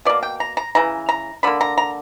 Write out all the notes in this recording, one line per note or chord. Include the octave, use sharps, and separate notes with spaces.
B2 A#3 D5
G5
A#5
A#5
C#3 E3 A#5
A#5
D3 A#3 B5
A#5
A#5